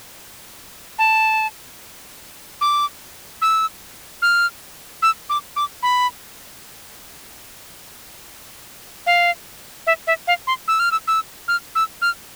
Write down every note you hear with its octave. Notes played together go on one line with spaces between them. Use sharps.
A5
D6
E6
F6
E6
D6
D6
B5
F5
E5
E5
F5
C6
E6
F6
E6
E6
F6
E6
F6